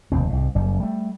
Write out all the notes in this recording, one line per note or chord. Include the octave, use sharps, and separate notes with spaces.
F1 D#2 B2 C4
C2 G#2
F#1 F#2 G3
G3 A3